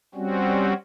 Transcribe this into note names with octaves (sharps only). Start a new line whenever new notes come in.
G3 C4 C#4 F#4